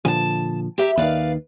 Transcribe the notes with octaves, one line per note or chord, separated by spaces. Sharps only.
A#2 D3 F3 G#5 A5
G4 E5 A#5
D#2 D#3 B4 D5 F5